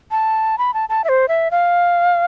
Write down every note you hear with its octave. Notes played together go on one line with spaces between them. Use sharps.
A5
B5
A5
A5
E5
C5
E5
F5